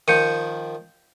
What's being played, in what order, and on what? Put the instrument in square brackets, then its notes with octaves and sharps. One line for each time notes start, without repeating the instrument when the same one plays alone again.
[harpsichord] D#3 F3 [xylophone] G6 C#7 D#7